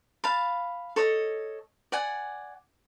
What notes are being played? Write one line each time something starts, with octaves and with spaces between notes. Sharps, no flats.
F5 A5 B5
A4 C#5 D#5
D5 F#5 G#5